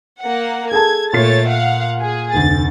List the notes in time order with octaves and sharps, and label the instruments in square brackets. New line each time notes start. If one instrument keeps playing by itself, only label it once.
[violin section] A#3 F#5
[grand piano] G#4 A4 A5 [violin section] G#6
[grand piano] A#2 C7 [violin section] A3 C#5 A6
[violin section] F5 F#5
G#4
[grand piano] F1 D2 [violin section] A6